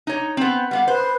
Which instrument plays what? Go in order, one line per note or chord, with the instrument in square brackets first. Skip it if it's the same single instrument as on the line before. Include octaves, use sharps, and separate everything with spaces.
[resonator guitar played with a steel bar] D#4 C#5
B3 C4
[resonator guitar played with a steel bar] G3 B3 F5 [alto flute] F#5
[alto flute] B4 [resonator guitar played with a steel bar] C5